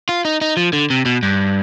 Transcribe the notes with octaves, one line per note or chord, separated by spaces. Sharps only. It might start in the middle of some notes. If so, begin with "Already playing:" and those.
F4
D#4
D#4
F3
D3
C3
B2
G2